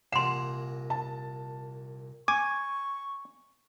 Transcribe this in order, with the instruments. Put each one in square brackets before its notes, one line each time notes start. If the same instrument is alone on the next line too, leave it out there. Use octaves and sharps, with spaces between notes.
[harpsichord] C2 A#2 [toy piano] F#5 C6 [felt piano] E7
[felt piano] A5
[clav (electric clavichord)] G#5 [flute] C#6 [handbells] D6